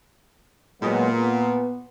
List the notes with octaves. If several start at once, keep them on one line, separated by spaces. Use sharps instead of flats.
A#2 F#3 G#3 B3
B3